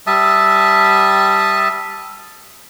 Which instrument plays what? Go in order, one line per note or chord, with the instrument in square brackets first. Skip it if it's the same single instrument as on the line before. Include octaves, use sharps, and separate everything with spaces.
[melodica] G3 E5 A5 D#6